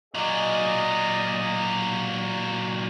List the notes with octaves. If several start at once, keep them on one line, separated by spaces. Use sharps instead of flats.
A#2 F#3 G#4 D5 D#5